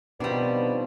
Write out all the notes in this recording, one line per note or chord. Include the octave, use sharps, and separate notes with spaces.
B2 D#3 F3 G3 C4 D4 B4